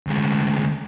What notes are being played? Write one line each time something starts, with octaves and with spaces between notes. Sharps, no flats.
D2 G#3